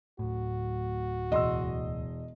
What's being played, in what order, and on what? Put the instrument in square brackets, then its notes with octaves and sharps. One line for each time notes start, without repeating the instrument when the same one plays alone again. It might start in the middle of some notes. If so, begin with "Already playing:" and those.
[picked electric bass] D1 A2 [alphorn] F#4
[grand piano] E1 C6 E6 [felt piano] D#5